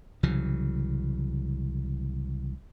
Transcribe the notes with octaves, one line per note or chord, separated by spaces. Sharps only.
C2 C#3 E3 F#3